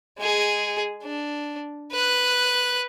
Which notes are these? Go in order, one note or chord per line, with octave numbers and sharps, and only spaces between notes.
G#3 G#4
D4
B4 F#6